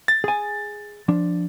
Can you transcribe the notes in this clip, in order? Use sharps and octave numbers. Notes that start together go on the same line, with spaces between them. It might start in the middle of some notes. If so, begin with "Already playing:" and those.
A6
G#4 G#5
F3 D4